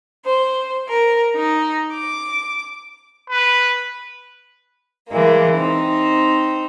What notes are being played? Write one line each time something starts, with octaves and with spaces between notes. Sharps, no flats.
C5
A#4
D#4
D6
B4
E3 G#3 A#3
C4 D#4